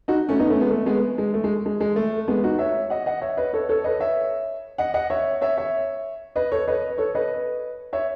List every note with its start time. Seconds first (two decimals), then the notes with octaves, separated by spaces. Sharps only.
0.08 D#4 F#4
0.29 A3 C#4
0.39 B3 D#4
0.50 A3 C#4
0.61 G#3 B3
0.70 A3
0.86 G#3 B3
1.18 G#3
1.34 A3
1.44 G#3
1.66 G#3
1.80 G#3
1.96 A3
2.28 G#3 B3
2.44 D#4 F#4
2.59 C#5 E5
2.90 D#5 F#5
3.06 D#5 F#5
3.21 C#5 E5
3.37 B4 D#5
3.53 A4 C#5
3.69 A4 C#5
3.84 B4 D#5
4.00 C#5 E5
4.78 D#5 F#5
4.94 D#5 F#5
5.10 C#5 E5
5.41 C#5 E5
5.57 C#5 E5
6.36 B4 D#5
6.51 A4 C#5
6.68 B4 D#5
6.98 A4 C#5
7.15 B4 D#5
7.93 C#5 E5